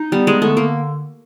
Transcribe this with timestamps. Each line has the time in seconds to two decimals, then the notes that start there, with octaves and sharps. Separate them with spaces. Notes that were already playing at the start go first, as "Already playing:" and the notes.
Already playing: D#4
0.12 G3 B3
0.27 G#3
0.42 D3 A3
0.57 A#3